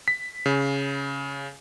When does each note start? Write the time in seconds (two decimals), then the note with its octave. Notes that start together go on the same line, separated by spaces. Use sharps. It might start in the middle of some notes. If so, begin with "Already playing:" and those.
0.08 B6
0.46 C#3